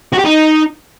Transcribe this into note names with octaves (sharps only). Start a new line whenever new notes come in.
F#4
G4
D#4